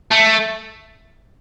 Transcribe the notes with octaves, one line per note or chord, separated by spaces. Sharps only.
A3